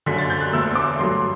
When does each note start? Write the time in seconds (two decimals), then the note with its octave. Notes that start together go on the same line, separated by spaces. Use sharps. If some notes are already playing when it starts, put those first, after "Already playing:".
0.06 F#1 F#2 D3 B6
0.18 A6
0.30 G6
0.41 F#6
0.52 E1 D2 D3 A3 E6
0.75 D6
0.99 G2 F#3 A3 C6